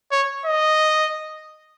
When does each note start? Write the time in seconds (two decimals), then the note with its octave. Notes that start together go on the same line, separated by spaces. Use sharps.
0.12 C#5
0.46 D#5